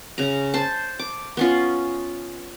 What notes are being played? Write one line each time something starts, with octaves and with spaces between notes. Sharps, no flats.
C#3 A#5
C5 A5
D6
B3 C#4 F4